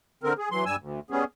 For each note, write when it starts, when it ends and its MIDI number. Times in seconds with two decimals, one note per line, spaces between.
0.23 0.33 50
0.23 0.33 60
0.23 0.33 70
0.38 0.49 68
0.51 0.64 52
0.51 0.64 54
0.51 0.64 84
0.66 0.76 43
0.66 0.76 55
0.66 0.76 80
0.66 0.76 88
0.80 1.00 38
1.11 1.24 55
1.11 1.24 59
1.11 1.24 61
1.11 1.24 68